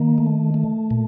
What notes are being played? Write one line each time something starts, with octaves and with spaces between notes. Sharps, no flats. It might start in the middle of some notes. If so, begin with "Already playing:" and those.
Already playing: D#3 A#3
A3
A3
A#2